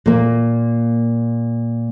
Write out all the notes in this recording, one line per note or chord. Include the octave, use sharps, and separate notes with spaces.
A#2 A#3